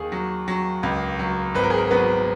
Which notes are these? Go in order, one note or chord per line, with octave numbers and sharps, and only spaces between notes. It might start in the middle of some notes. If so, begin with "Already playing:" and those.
Already playing: D#2 G#4
F#3
F#3
C#2
F#3
G#1 B4
A#4
G#4
A#4
F#3 B3 B4